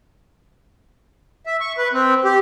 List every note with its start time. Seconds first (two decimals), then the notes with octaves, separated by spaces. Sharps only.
1.46 E5
1.61 C#6
1.78 B4
1.93 C4
2.25 G4